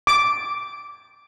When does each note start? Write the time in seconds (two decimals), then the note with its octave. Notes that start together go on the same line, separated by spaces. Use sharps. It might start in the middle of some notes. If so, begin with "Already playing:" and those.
0.07 D6